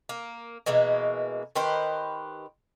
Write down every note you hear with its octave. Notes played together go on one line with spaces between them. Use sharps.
A#3
B2 E3 G#3 A#3
D#3 G4 B4 C5